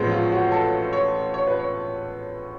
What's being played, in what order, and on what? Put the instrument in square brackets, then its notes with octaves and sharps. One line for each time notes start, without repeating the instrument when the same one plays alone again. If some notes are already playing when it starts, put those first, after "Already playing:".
Already playing: [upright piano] A1 A2 F3 G#3 B3
F4
F#4
A4
C#5
C#5
B4
C#5